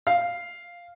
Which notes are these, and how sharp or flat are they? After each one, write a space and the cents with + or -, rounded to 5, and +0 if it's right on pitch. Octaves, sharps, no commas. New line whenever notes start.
F5 -5